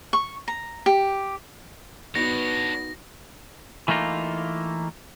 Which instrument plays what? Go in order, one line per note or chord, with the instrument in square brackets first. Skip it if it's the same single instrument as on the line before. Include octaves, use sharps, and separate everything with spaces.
[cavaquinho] C#6
A#5
G4
[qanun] B3 D#4 F#4 [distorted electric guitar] D4 C#5 [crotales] A#6
[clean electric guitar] E3 A3 A#3 D#4 F4